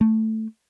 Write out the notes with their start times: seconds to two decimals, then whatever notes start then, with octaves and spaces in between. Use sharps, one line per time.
0.01 A3